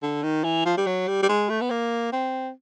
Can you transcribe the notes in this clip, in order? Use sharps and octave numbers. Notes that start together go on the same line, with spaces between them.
D3
D#3
E3
F3
G3
F#3
G3
G3
G#3
A3
B3
A#3
C4